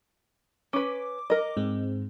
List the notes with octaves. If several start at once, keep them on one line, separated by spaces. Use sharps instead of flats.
C#4 B4 D6
A#4 D#5
G#2 G#3 C4